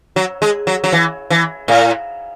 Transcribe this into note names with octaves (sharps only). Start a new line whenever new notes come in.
F#3
G#3
F#3
F#3
E3
E3
A2